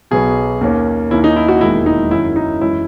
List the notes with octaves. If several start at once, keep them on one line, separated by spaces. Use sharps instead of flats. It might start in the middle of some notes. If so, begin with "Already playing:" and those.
B1 B2 F#3 B3 G#4
D#2 D#3 A#3 C#4
D#2 D#3 A#3 C#4 E4
D#4
E4
F#4
E1 D#2 D#3 G#3 E4
D#4
F#2 D#3 F#3 C#4 E4
D#4
F#2 E3 G#3 C#4 E4